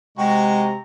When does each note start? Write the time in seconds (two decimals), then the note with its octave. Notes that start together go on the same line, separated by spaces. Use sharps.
0.18 C3 G#3 F#4 G5 A#5 C#6